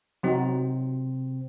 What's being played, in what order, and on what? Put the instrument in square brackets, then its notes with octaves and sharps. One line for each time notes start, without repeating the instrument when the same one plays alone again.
[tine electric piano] C3 C4 [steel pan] F#3 D#4 F#4